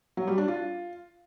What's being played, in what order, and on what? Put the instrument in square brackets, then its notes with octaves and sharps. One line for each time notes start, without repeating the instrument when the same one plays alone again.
[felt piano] F#3
G3
D4
F4